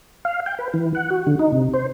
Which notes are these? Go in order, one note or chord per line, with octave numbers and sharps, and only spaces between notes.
F5
G5
B4
E3
F#5
F#4
D3
D#4
C3
C5